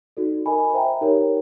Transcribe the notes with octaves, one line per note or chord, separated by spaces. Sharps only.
D#4 F#4 A4 D5
A#4 D#5 G#5 B5
C5 E5 G5 A#5
D#4 G4 A#4 C#5